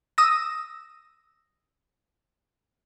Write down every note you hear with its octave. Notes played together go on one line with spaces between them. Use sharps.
D#6 E6 A#6